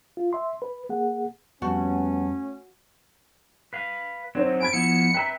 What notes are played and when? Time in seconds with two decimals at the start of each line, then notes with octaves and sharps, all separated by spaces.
0.17 F4
0.33 E5 C6
0.62 B4
0.89 A#3 G#4 F#5
1.62 F2 G3 A3 B3 C#4 F#4 A5
3.73 B4 F5
4.35 F#3 C4 D#4 C5 C#5
4.60 G#5 B5 G#6 D7
4.73 F3 B3 E4 C#7
5.14 B4 E5 G5 A#5